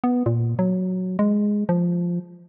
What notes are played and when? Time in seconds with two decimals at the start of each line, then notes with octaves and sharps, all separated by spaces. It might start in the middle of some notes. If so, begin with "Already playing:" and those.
0.04 B3
0.26 A#2
0.59 F#3
1.19 G#3
1.69 F3